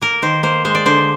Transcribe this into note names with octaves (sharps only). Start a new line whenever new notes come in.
A#3 A#4
D#3 C5
A#3 C5
G#3 C5
D5
D3 C5